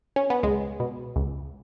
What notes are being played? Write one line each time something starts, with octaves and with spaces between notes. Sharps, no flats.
C#4
B3
C#2 G#3
B2
C#2